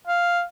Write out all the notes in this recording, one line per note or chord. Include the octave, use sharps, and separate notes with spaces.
F5